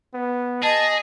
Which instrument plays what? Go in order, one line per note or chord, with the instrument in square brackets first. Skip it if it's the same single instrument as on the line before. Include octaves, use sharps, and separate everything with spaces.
[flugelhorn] B3
[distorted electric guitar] G#4 [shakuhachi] D#5 [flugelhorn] A5